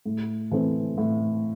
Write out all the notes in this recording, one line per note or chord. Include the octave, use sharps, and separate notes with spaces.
A2
E3 A3 C4
A2